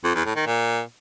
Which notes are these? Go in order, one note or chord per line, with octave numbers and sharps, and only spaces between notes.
F2
E2
A2
D#3
A#2